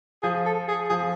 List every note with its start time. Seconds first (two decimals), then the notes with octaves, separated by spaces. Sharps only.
0.23 F3 G#4
0.45 A4
0.68 G#4
0.89 F3 G#4